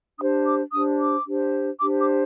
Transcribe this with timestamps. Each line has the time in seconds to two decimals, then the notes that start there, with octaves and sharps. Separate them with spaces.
0.18 D4 G4 C5 D#6
0.46 D6
0.72 D4 G4 C5 D#6
1.00 D6
1.26 D4 G4 C5
1.81 D4 G4 C5 D6
1.99 D6